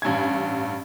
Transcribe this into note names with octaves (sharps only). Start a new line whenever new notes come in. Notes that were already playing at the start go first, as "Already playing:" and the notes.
A1 G2 G#5 G#6